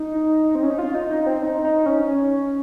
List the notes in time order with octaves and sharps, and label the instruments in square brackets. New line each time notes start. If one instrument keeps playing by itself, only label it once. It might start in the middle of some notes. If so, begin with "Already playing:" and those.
Already playing: [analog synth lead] D#4
C4
C#4
D#4
F4
D#4
D#4
C4
D#4
D#4
C#4
C#4